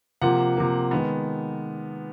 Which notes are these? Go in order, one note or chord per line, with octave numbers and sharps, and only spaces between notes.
C3 F3 A#3 F#5
C3 F3 A#3
D#3 G#3 B3